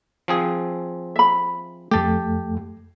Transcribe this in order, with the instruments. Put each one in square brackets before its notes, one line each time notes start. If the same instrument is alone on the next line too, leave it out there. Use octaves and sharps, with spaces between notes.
[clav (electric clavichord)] F3 C4 G#4
[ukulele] E5 B5
[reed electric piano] F2 A3 [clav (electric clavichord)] G4 A5